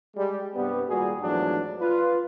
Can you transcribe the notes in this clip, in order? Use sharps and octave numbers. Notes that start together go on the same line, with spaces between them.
G3 G#3
G2 C3 G3 B3
G#1 A#2 G3 F#4 G#4
E2 G#2 F3 F#3 A3 D4
F4 B4